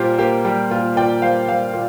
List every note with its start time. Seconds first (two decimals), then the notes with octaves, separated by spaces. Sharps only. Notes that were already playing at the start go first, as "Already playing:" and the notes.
Already playing: A#2 G3 A#3 F4 G4 A#4 C5
0.18 A#3 G4 C5
0.45 G3 G4
0.70 A#2 F4
0.96 A#2 D5 G5
1.22 G3 C5 F5
1.48 G3 C5 F5
1.74 A#2